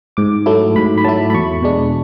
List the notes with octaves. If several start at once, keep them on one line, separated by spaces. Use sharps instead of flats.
G#2 D6
F#3 A3 E4
G#2 B5
B5
F#3 A3 E4 A5
B5
E2 C#6
B2 G#3 D4